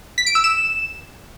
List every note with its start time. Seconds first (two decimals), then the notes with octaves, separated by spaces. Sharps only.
0.18 B6
0.26 D7
0.35 E6
0.44 E7